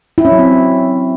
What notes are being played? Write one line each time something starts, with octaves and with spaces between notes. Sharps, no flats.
E4
C#4
F#3
C4